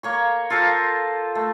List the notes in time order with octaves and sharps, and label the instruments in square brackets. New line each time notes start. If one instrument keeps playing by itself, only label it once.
[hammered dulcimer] A#3 C#5 C#6
F4 A4 A#4 C5
A3